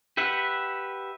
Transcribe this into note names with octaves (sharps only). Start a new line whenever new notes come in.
G4 B4 E5 F#5